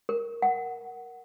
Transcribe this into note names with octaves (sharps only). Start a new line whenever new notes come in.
A#4
F#5